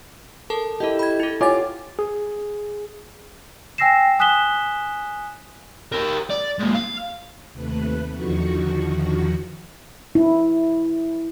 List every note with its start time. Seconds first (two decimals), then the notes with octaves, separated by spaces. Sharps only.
0.50 A4 A#4 A5
0.80 E4 G4 A4 D#5
0.99 B5 G#6
1.20 E4 A4
1.41 F4 G4 C#5 F#5 G#5 D6 A6
1.99 G#4
3.78 G5 G#5 E6 A#6 C7 E7
4.19 G#5 D#6 F#6 B6 E7 G7
5.92 G4 A#4
6.30 D5
6.59 G#2 A#3
6.74 F5
7.52 D#2 C3 A3 B4 F#6
8.13 E2 D3 D#3 F3 F#4 C#6
10.15 E4